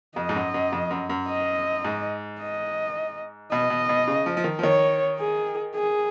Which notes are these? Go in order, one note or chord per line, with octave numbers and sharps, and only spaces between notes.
F2 D#5
G#2
F#2
F#2
F2
F#2
F#2
D#5
G#2
D#5
B2 D#5
B2
B2
C#3
F3
F3
D#3
F3
D#3 C#5
G#4
G#4